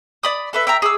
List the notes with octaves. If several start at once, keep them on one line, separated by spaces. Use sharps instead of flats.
D5 B5 D#6
A4 B4 E5
E5 G5 A#5
G#4 D6 E6